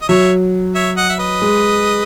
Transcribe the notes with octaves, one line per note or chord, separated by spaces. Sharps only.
D#5
F#3 C#5 E5
C#5 E5
D#5 F#5
E5
B4 D#5
G#3